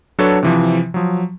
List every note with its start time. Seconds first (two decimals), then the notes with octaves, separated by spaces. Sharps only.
0.19 F#3 D4 F#4 A4 B4 C#5
0.43 C3 E3 F3
0.94 F3 F#3